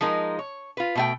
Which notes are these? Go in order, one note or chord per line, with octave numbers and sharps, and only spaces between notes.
F3 G#3 D#4 A#4
C#5
F4 B4
B2 A3 G5